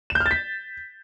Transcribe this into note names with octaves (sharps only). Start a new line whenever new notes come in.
E7
G6
F6
A6
B6